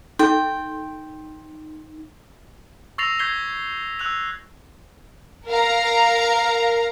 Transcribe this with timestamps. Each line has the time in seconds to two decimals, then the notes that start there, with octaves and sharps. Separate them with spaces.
0.19 D#4 G5
2.98 C#6 E6 A6 A#6 C7 F7
3.19 C#6 G6 G#6 B6 C7 G7
3.99 E6 F#6 F7
5.47 A#4 F5 A#5